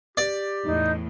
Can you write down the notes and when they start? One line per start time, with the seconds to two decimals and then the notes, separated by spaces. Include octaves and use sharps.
0.17 G4 D5
0.65 E2 A2 D#4